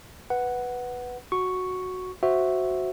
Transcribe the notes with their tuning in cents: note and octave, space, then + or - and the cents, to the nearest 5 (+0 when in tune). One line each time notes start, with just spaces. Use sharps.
B4 +0 F#5 +0
F#4 -5 C#6 +0
F#4 +0 C5 +0 E5 +0